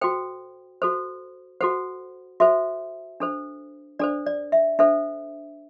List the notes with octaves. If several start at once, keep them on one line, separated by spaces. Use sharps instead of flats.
F#4 A4 C5 G5
F#4 A4 C5
F#4 A4 C5 F#5
F#4 A4 C5 E5
D4 A4 C5
D4 A4 C5 D5
D5
E5
D4 A4 C5 E5